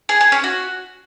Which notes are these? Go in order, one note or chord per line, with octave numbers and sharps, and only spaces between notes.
G#4
G#4
C#4
F#4